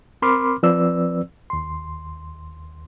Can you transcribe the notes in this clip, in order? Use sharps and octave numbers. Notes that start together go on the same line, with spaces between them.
C4 A#4 B5 C6 D6 F6
F3 C4 B4 D5 E6
D#2 C6